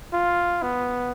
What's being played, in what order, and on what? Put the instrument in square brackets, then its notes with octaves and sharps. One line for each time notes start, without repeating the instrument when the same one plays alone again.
[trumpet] F4
B3